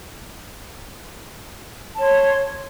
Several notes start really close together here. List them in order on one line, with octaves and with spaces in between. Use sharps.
A5 C#5 C6